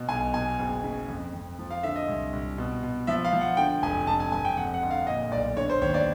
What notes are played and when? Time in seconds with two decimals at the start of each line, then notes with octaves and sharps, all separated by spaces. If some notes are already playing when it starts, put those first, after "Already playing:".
Already playing: B2
0.09 B1 G#5
0.34 B2 G#5
0.59 F#1
0.84 C#3
1.08 F2
1.34 F2
1.59 F3
1.71 F5
1.83 D3 E5
1.96 D#5
2.08 C2
2.33 C2
2.58 B2
2.83 B2
3.07 F3 E5
3.25 F5
3.33 F3
3.41 F#5
3.57 D3 G5
3.82 F1 G#5
4.07 F1 A5
4.20 G#5
4.32 F1 G#5
4.45 G5
4.57 F2 F#5
4.74 F#5
4.83 G1
4.91 F5
5.07 A#2 D#5
5.31 B1 D5
5.57 D3 C#5
5.70 C5
5.82 D#2 C#5
5.94 D5